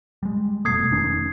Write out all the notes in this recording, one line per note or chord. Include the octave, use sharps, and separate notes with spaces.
G3 G#3
F1 B2 A3 D#6 G#6 C7
F1 D#3 C#4